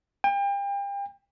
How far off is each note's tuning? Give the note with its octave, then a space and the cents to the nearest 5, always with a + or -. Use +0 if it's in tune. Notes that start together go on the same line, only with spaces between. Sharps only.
G5 +35